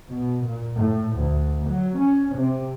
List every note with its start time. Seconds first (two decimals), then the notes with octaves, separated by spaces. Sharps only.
0.10 B2
0.45 A#2
0.76 A2
1.18 D2
1.70 F#3
1.99 C#4
2.36 C3